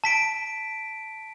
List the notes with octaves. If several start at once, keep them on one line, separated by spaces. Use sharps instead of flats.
A5 B6 D7